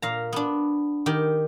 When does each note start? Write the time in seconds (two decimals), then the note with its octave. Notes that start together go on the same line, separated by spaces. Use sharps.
0.02 A#2 F5 A#5
0.33 B3 D4
1.06 D#3 G4 G5